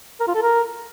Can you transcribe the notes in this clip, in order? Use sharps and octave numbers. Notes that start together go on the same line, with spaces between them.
A#4
F4
A4
A#4